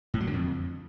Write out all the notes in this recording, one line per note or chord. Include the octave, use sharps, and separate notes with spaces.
A2
F#3
D3
F2